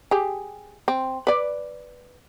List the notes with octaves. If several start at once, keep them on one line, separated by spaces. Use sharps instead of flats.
G4 G#4
C4
B4 D5